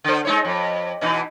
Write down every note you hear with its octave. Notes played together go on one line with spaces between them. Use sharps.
D3 C5
G#3 D#4 C#5
F2
B2 E3 D#4